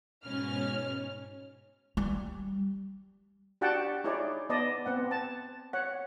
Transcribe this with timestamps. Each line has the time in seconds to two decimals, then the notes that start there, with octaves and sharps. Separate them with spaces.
0.24 G#2 B2 C#4 F6
1.97 G3
3.61 D4 F#4 G4 F#5 G5 A5
4.04 D#4 E4 G#4 C#5 D5
4.50 B3 D5 D#5 A5
4.86 B3 C4 F#5
5.11 A5
5.73 C#5 F#5